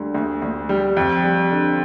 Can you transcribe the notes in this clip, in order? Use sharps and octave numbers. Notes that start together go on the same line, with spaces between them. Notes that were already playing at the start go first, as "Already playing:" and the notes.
Already playing: D2 D3 G3
D2
D2
G3
F2
G3
D3